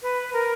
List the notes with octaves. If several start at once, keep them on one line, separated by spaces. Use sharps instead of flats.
B4
A#4